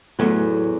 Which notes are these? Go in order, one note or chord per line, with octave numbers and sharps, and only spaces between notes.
E2 A2 F#3 C#4 F#4